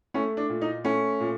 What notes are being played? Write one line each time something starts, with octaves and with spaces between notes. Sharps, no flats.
A3 C#4
D4
A#2
D#4
A3 C#4
A#2